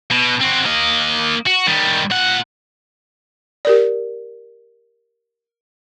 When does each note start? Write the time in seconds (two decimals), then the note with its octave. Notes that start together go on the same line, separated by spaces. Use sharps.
0.11 B2
0.41 C4 F#4
0.66 A#3 D#5
1.46 F#4
1.67 D#3 G3
2.11 A#2 F#5
3.65 G4 A#4 D5